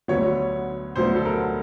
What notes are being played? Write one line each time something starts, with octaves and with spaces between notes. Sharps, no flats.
D2 D3 F#3 B3 C#5
D2 D3 F#3 B3 C5
A4
A#4